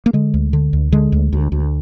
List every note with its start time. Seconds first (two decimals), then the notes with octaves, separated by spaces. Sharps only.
0.06 A#3
0.13 D3 G#3
0.34 D2
0.53 D3
0.73 D2
0.92 D3 G#3
1.12 D2
1.33 D2
1.52 D2